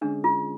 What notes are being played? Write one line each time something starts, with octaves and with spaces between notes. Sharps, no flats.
D3 G#3 C#4 D4 G#4
F4